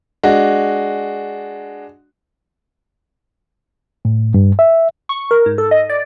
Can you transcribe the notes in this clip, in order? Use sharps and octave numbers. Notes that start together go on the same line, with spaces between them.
G#3 D4 F#4
A2
G2
E5
C#6
A#4
G#2
A4
D#5
D5